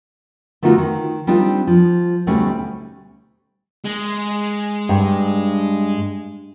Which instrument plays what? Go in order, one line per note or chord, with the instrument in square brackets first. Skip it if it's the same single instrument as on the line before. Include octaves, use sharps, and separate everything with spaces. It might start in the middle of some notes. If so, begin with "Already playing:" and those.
[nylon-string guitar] D3 A3 B3 D#4 F4 F#4
D#3
G3 C4 D4 D#4 F4
F3
D2 B2 G3 A3 C#4 D#4
[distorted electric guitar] G#3
[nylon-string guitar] G2